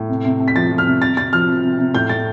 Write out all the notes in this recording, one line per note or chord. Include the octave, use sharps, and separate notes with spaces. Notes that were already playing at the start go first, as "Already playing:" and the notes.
Already playing: A2
C3
C3
C3
B6
F3 A6
F3
F6
C3
C3 A6
C3 A6
F3 F6
C3
C3
C3
A2 G6
A2 A6